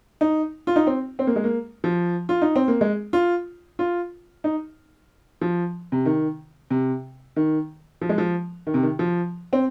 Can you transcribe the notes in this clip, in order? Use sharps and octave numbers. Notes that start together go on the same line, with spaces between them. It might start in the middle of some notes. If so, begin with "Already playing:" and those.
D#4
F4
D#4
C4
C4
A#3
G#3
A#3
F3
F4
D#4
C4
A#3
G#3
F4
F4
D#4
F3
C3
D#3
C3
D#3
F3
G#3
F3
D#3
C3
D#3
F3
C4